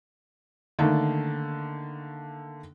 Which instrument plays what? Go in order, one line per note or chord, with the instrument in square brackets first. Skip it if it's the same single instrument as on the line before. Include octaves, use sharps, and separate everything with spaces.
[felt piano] D3 D#3 A3 A#3 D4